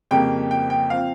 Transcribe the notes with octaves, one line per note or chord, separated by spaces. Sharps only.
F2 C#3 G3 A#3 G5
G5
G5
F3 C4 F5